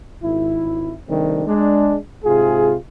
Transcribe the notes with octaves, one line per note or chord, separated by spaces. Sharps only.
G#1 E4
C3 D#3 G3 A3 C4 D4
G#3 D4
G#2 C3 F4 G#4